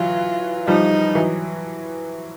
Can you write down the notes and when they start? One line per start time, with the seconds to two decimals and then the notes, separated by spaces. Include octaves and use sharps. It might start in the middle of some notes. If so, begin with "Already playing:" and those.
Already playing: E3 F#3 F4
0.68 F3 G3 D#4
1.15 E3 F#3